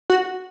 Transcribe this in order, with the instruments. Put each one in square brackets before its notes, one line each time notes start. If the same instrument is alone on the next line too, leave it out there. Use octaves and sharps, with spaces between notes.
[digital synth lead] F#4